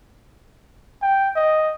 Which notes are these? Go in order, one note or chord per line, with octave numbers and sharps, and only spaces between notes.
G5
D#5